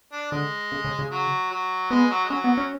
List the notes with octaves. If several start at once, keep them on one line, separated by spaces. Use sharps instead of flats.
D4
D3 G#3
C#3
C#3
C#3
F#3
F#3
G#3 B3
F#3
G#3
F#3 C#4
B3
C#4